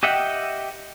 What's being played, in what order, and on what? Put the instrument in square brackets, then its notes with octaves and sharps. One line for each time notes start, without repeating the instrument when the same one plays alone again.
[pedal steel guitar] G4 D#5 E5 F#5 G5